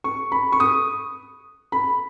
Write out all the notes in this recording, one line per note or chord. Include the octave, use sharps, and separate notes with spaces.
C#6
B5
C#6
D#6
B5